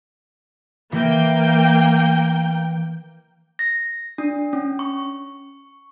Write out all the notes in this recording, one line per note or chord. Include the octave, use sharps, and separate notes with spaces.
E3 A#3 G5
A#6
D4
C#4
C#6